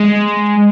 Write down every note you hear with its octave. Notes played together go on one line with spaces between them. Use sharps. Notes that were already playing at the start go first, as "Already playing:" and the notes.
Already playing: G#3